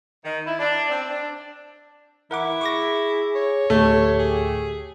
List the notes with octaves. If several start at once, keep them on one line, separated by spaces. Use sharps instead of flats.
D#3
E4
D4
C4
D4
E3 E4 A#4 F#5 D6
G#4 C#6 D6 A#6
C#5
D2 A2 A3 G4
G#4